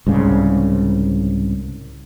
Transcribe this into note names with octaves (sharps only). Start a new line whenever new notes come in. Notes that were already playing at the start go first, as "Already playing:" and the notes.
C2 G#2 C#3